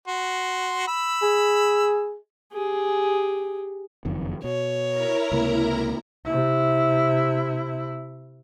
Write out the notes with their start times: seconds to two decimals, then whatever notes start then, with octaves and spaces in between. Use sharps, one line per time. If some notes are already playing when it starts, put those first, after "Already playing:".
0.08 F#4 C6
0.87 B5 E6
1.22 G#4
2.53 G4 G#4
4.05 F#1 F2 D#3
4.44 B2 C#5
4.88 E4 A#4 A#5
5.32 C#2 C3 A#3
6.25 C3 E4